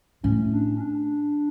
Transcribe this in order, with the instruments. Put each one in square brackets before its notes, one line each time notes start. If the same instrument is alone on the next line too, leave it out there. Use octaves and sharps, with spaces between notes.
[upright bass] A2 [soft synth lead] C#4
[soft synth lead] D4
C#4
D4